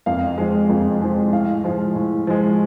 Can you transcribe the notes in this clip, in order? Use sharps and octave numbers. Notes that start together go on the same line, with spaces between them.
F2 F5
F3 G#3
F2
F3 G#3
A2 F5
F3 G#3
A2
F3 G#3